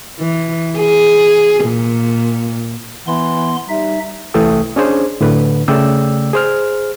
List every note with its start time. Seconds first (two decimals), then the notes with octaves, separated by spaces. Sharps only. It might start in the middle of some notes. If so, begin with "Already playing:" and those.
0.20 E3
0.79 G#4
1.65 A#2
3.07 E3 B3 C6
3.69 G3 D#4 E5
4.34 C2 E3 A3 A4 G5 D#6
4.76 C#4 D4 G#4 C5
5.21 A2 D3 B4
5.68 C#3 A3 D5 G5 E6
6.33 G#4 C5 F6